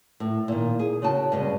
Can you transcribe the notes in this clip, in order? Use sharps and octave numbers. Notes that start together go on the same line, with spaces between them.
A2
A#2 D#3
G#4
C#3 F#4 G5 A5
G2 C#3 G#3